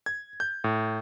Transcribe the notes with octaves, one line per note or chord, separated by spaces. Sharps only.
G#6
G6
A2